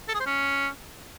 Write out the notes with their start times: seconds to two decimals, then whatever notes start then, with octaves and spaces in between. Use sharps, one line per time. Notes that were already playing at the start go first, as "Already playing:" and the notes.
0.08 A4
0.14 G#4
0.20 C5
0.26 C#4